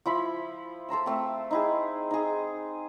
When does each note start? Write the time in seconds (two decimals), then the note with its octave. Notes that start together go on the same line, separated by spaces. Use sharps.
0.06 F3 E4 B5
0.89 A4 C5 A#5 E6
1.06 A3 C4
1.51 D#4 E4 G#4
2.11 D#4 G#4